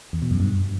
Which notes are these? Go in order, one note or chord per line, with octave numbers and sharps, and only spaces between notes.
E2
B2
F#2
G2